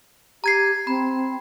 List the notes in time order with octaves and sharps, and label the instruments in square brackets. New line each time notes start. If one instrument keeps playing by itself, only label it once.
[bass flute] G4 [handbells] A#5 G#6 C7
[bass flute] C4 [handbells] B5